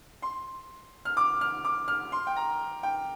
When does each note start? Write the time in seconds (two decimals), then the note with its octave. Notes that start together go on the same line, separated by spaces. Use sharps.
0.22 C6
1.05 F6
1.17 D6
1.41 F6
1.65 D6
1.88 F6
2.12 C6
2.27 G5
2.36 A#5
2.83 G5